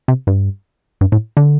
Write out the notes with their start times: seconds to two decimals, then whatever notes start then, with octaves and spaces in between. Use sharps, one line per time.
0.08 C3
0.27 G2
1.01 G2
1.12 A2
1.37 D3